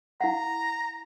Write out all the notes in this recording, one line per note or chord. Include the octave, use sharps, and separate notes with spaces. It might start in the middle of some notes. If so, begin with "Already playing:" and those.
E4 F5 F#5 A#5